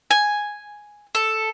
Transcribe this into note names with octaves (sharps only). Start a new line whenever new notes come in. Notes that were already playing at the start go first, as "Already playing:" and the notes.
G#5
A4